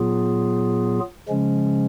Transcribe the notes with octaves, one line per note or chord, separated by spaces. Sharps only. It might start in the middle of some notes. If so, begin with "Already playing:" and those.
Already playing: A#2 F#3 B3 F4 G#4
C#3 F3 G#3 C#4